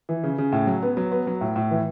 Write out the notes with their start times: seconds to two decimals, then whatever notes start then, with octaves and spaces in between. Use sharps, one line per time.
0.09 E3
0.23 C#3
0.38 C#3
0.52 A2
0.67 F#3
0.83 B3
0.97 F#3
1.12 B3
1.27 F#3
1.41 A2
1.56 A2
1.71 E3